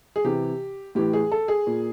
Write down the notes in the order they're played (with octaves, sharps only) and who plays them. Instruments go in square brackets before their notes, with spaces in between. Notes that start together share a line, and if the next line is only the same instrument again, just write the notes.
[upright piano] G#4
C3 E3 G4
A2 E3 G4
G#4
A4
G#4
A#2